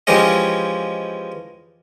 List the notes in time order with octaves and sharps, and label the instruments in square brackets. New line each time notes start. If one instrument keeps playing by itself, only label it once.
[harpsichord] E3 F3 G#3 C#4 G4 D#5